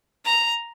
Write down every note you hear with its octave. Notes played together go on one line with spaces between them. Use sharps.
A#5